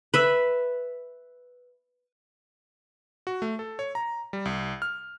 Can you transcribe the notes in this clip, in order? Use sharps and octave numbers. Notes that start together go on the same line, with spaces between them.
B4 E5
F#4
A3
A4
C#5
A#5
G3
C2
F6